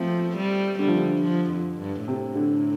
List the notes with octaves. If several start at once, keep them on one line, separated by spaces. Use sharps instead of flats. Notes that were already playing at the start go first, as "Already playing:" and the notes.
Already playing: F3 A3 C4
G3
D3 G3
F3
D3
F3
F2
G2
A2 C3
D3